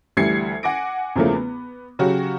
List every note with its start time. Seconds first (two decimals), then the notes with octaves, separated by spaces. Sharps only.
0.17 D2 E3 G3 G#6 C7 C#7
0.63 F#5 G#5 D6 A#6 D7
1.16 E2 C#3 F3 A3 A#3
1.34 B3
1.99 C#3 F#3 F#4 G4